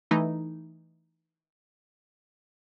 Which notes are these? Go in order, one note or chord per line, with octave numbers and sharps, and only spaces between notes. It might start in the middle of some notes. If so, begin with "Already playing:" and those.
E3 A3 D#4